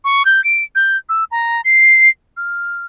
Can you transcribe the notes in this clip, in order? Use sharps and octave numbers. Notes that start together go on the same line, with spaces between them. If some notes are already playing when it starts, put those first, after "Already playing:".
C#6
G6
D7
G6
E6
A#5
C7
F6